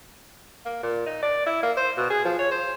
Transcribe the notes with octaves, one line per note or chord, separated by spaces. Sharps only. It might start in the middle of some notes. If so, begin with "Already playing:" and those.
A#3
A#2
D#4
D5
E4
A#3
C5
B2
G#4
F3
C#5
C5